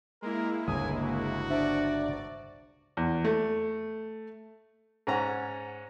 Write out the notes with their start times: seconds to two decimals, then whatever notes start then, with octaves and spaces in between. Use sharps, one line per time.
0.22 G#3 A#3 E4 A#4
0.67 G1 C#2 G#5 D#6
1.01 F#4
1.50 D4 C5 D5 E5
2.97 E2
3.25 A3
5.07 G#2 C#4 F#5 A#5